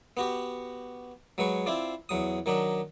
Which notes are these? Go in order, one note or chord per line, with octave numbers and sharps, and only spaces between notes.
B3 F#4 G4
F#3 G#3 B4 C#6
C4 E4 F4 D5
E2 F#3 D#6
D#3 F#3 D4 D#4